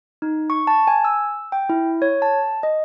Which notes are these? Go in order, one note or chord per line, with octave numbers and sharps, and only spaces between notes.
D#4
C#6
A5
G#5
E6
G5
E4
C#5
A5
D#5